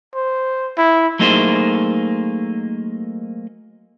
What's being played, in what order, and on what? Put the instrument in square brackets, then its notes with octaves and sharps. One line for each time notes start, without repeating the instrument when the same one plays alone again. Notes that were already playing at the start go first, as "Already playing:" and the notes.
[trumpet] C5
E4
[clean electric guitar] F#3 A3 A#3 D#4 G#4 C5